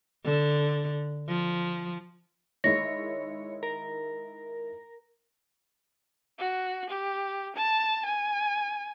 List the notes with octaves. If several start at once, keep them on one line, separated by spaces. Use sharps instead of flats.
D3
F3
D#3 G#3 E4 C#5 A#6
A#4
F#4
G4
A5
G#5